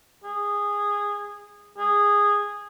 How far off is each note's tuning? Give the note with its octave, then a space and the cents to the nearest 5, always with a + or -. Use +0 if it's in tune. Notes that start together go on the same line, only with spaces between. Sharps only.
G#4 -15
G#4 -15